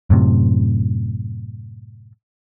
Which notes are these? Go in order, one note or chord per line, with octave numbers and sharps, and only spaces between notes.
F#2 A2 C3